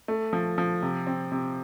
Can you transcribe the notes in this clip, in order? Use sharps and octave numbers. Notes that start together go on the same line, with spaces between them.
A3
F3
F3
C3
C4
C3